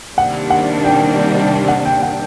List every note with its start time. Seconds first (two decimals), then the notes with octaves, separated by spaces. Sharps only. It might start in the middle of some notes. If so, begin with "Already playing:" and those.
0.17 C3 D#3 G3 A#3 D4 F#5
0.50 F#5
0.84 G5
1.68 F#5
1.85 G5
2.02 F#5